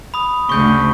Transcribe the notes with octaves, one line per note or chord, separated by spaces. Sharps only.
B5 D#6
D2 C#3 C#6 G6